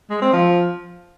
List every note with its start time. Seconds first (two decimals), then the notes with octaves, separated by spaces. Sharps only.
0.10 G#3
0.21 C4
0.33 F3